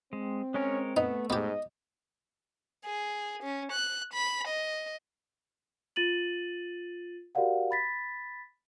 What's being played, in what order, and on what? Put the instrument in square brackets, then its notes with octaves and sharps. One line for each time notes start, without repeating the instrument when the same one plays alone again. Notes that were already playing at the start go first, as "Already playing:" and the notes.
[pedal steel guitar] G#3 [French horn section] C4
[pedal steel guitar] G#3 A#4 C#5 [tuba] C#4
[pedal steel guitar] A3 [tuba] B3 [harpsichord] D#4
[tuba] G#2 [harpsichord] B3 G4 [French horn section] D#5
[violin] G#4
C#4
F#6
B5
D#5
[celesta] F4 A6 D#7 F#7
F#4 G4 A#4 D5 F5 F#5
B5 A6 B6